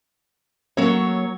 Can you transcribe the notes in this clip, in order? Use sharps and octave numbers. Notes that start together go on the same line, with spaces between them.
F#3 A3 A#3 C#4 C#5